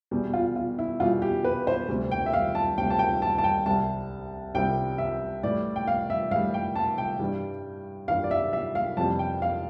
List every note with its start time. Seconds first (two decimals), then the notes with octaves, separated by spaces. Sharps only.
0.11 E2 B2 G3
0.34 F4
0.56 F4
0.79 E4
1.00 E2 B2 G3 F4
1.22 G4
1.44 B4
1.67 C5
1.88 D2 C3 G3
2.11 G5
2.26 E5
2.33 F5
2.55 A5
2.77 D2 C3 G3 G5
2.90 A5
2.99 G5
3.22 A5
3.38 A5
3.44 G5
3.65 C2 C3 G3 A5
4.55 C2 C3 G3 G5
4.98 E5
5.43 A2 E3 G3 D5
5.76 G5
5.88 F5
6.10 E5
6.31 A2 E3 G3 F5
6.54 G5
6.76 A5
6.98 G5
7.19 G2 E3 G3
8.08 G2 E3 G3 F5
8.24 D5
8.31 E5
8.53 E5
8.75 F5
8.97 F2 C3 E3 G3 A5
9.19 G5
9.42 F5